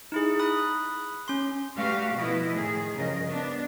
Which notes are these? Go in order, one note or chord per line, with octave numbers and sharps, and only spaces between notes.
D#4 E4 G#4
B5 D#6 F#6
C#4 C6
G3 A3 F#4 G4 B4 F5
B2 F3 A3 E4 B4 D#5
A2 D#3 G#4
G2 C#3 F3 A#4 D#5
B3 D4